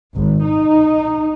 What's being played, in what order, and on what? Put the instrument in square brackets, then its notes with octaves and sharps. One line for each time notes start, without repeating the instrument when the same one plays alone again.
[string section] G#1
D#4